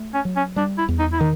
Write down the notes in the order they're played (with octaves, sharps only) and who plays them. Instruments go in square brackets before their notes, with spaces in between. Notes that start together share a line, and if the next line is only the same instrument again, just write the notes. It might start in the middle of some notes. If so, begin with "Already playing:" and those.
Already playing: [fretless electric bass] A3
[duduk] C#4
[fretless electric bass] F#3
[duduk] C#4
[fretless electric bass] G3 [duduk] D4
[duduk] E4
[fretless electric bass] E2
[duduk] D#4
E4
[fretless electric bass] D#3 [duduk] D#4